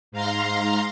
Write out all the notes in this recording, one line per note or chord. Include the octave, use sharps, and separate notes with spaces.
G#2 F5 A#5 C6